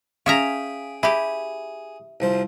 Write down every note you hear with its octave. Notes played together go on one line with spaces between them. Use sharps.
C#4 G#4 E5 F5 G5 A#5 D#6 B6
E4 G4 G#4 E5
C2 F3 C5